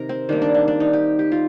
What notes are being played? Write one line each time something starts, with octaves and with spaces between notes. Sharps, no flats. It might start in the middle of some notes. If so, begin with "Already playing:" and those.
Already playing: C3 D#3 A#4
C4
D#3 G3 A#3 D4
D4
D4
D4
D#4
G4
G4
F4